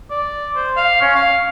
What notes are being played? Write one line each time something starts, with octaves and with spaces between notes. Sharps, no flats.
D5
C5
F5
C#4
F5